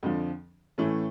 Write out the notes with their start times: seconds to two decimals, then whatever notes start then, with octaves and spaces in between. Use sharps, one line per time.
0.03 F2 D3 F3
0.78 A2 E3 A3 C#4